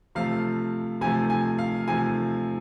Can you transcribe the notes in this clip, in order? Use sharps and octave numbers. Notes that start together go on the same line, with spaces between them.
C3 F3 A3 F5
C3 F3 A3 G#5
G#5
F5
C3 F3 A3 G#5